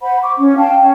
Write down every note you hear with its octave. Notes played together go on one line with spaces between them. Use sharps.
C5 F#5 B5
C#6 D6
C#4
F5 G5 A5
C#4